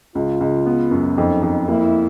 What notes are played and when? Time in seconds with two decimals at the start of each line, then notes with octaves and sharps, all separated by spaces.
0.15 C#2 F4
0.41 C#2
0.66 B3
0.91 F#2
1.17 F2 D#4
1.43 F2
1.68 A#3 E4